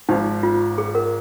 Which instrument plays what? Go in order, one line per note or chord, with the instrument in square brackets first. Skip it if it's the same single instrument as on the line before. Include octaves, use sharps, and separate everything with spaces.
[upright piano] G#1 G#2 F3 [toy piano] D#4
[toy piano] F4
G#4
A#4